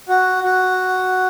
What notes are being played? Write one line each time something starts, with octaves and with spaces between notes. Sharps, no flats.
F#4
F#4